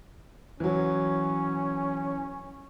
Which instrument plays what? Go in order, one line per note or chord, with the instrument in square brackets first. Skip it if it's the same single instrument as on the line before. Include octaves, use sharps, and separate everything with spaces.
[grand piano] E3 F#3 [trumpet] C#4